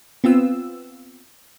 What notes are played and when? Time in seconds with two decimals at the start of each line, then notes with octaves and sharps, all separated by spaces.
0.24 B3 C4 F4 E6